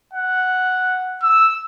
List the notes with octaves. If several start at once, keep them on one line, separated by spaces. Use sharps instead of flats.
F#5
E6